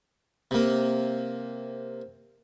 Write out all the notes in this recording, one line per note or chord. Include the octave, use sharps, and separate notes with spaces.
C3 A#3